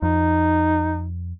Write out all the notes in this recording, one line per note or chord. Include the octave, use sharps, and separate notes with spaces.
F2 D#4